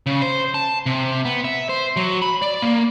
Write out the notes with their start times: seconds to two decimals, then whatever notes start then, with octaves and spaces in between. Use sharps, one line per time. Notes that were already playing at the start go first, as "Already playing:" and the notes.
0.07 C#3
0.22 C5
0.54 A5
0.86 C3
1.25 B3
1.44 E5
1.69 C5
1.97 F#3
2.22 B5
2.42 D5
2.62 A#3